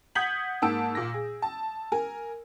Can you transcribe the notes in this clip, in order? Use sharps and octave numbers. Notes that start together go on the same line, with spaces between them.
F#5 D#6 G6 G#6 B6 F#7
G#2 A#3 A5 E6 D7
A#2 A#6
G#4
A5
A#4 G#5